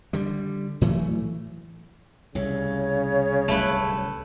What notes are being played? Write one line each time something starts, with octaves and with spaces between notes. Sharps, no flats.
D3 G3
A2 E3 F#3 A3
C2 A2 C#3 C#5
D1 C2 G3 A3 E4 B4